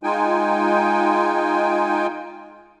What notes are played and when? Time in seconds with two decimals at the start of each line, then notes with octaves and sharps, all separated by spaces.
0.03 G#3 D#4 F4 G5 G#5